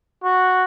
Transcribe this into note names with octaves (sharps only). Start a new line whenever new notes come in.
F#4